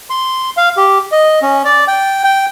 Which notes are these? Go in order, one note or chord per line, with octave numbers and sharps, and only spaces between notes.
C6
F5
G4
D#5
C#4
D5
G5
G5